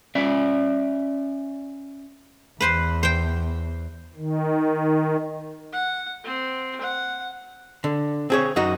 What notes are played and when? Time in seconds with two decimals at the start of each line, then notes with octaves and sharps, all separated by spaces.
0.15 C#4 D5 E5
2.60 E2 B4 C5 C6
3.03 C5 G5
4.16 D#3
5.73 F#5
6.24 C4
6.81 F#5
7.84 D3
8.30 C4 G#4 C#5
8.56 F#2 D#4 F#4